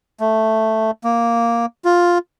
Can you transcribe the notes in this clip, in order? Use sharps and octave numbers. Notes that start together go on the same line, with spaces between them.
A3
A#3
F4